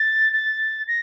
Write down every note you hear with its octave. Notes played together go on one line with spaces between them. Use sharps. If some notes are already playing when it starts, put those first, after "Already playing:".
Already playing: A6
A6
A#6